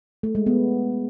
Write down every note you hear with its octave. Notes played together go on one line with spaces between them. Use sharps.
A3
G#3
B3